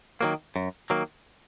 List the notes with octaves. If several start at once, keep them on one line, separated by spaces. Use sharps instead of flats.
D#3 F#3 A#3
F#2
D#3 F#3 A#3